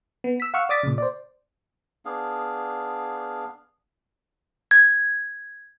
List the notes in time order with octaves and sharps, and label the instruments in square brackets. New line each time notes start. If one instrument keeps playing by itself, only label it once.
[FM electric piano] B3
E6 B6
F5 F#5 C#6 E6 F6
D5 D6 D#6 A6 B6
A#2 C#3
C5 D5
[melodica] B3 D4 G#4 F5
[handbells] G#6